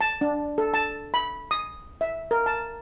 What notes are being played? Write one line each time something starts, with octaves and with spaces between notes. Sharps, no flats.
A5
D4
A4
A5
B5
D#6
E5
A#4
A5